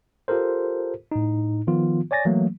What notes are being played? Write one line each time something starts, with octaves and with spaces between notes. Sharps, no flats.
F4 G4 A4 A#4 C5
A2 D#4
D#3 F3 B3 F4
C#5 D5 G#5 A6 A#6
E3 F#3 A3 A#3